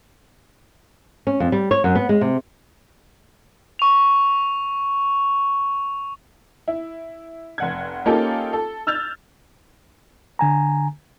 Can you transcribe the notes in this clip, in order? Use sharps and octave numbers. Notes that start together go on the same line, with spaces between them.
C#4
F2
G3
C#5
F#2
B3
G#3
C3
C#6 F7
E4
F1 F#5 G#6
A#3 C#4 D#4 F4 G4 A4
A4
E6 F6 G6 A6 F7
D3 G#5 A#5